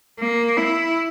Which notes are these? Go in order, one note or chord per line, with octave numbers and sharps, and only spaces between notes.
A#3
E4